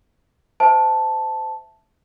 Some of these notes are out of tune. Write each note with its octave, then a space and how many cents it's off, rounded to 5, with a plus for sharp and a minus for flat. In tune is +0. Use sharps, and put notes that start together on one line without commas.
C5 -25 E5 +0 A5 +0